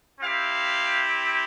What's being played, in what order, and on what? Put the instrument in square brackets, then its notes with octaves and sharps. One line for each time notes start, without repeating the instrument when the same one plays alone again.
[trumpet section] C4 E4 G4 F5